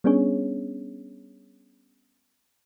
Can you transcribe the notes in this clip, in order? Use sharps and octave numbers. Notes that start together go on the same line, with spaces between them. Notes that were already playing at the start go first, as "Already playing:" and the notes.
G3 B3 C#4 D4 G#4 C#5